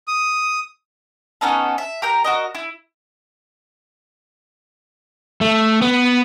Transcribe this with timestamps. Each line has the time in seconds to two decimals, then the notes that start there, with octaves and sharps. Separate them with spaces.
0.08 D#6
1.41 B3 C#4 D#4 A4
1.78 E5
2.02 G4 A#4 A#5 G6
2.24 F#4 A#4 D#5
2.55 E4
5.41 A3
5.82 B3